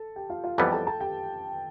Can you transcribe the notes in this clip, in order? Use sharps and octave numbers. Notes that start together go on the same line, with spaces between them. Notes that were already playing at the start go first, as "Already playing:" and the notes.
Already playing: A4 A5
G4 G5
F4 F5
F4 F5
F2 E3 G3 B3 A4 A5
G5
A4 A5
A4 A5
G4 G5